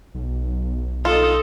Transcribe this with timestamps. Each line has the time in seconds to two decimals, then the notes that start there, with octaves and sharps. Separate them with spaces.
0.15 B1
1.05 D#4 F4 A4